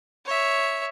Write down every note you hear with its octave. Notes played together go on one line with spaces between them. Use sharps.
C#5 E5